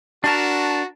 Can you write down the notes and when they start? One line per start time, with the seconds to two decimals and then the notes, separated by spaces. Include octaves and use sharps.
0.24 D4 F#4 A#4 A5